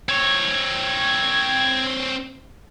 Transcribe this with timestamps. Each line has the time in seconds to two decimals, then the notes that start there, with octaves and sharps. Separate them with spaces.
0.09 C4 C#5 G#6